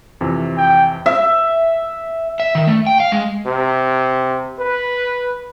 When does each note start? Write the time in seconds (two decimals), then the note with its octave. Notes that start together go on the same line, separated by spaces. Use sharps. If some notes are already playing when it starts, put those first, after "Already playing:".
0.21 F2 C3 E3
0.57 G5
1.06 E5
2.40 E5
2.55 D#3
2.67 A3
2.87 G5
3.00 F5
3.12 G#3
3.46 C3
4.59 B4